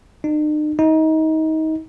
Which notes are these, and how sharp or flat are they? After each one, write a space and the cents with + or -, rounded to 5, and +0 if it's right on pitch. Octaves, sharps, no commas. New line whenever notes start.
D#4 -45
D#4 +25